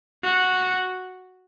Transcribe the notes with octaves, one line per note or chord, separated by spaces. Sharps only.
F#4